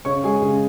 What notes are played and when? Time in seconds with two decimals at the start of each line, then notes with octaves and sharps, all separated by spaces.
0.05 C#3 C#5 C#6
0.23 G#3 G#4 G#5
0.42 C#3